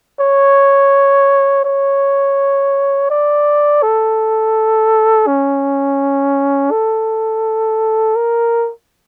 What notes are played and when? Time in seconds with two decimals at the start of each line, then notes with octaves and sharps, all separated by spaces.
0.20 C#5
1.65 C#5
3.10 D5
3.83 A4
5.27 C#4
6.71 A4
8.16 A#4